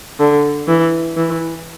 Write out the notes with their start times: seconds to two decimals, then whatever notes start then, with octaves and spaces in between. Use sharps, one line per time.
0.19 D3
0.68 E3
1.17 E3